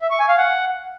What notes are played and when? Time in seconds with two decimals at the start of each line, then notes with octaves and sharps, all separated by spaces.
0.01 E5
0.10 C#6
0.19 G#5
0.29 F5
0.38 F#5